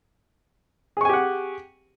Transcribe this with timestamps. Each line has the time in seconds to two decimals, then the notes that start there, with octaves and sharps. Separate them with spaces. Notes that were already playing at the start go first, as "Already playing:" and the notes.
0.97 G#4
1.01 C#6
1.05 G#5
1.09 G4
1.13 F#5